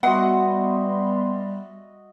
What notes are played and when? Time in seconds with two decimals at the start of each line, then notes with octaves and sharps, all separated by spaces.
0.03 G3 B3 F#4 D#5 E5 F#5 B5 C6